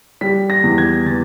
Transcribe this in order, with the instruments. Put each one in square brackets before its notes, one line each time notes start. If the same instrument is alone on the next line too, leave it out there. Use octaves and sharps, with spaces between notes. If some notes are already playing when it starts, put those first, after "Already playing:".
[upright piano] G3 B6
A#6
E2
G#6
E3 A6